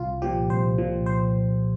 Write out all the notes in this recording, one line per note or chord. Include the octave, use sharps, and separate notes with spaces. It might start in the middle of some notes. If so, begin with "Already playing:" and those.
Already playing: C2 F4
A#2 F3 G4
C2 C5
A#2 F3
C5